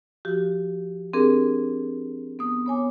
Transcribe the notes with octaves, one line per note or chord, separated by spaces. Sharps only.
F3 F#4 G4
C4 D4 G4 G#4 A#4
B3 D#6
B3 C#5 G#5 D6